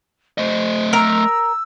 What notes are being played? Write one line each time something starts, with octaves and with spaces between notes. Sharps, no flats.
A3 C5 D#5
A#4 A#5 E6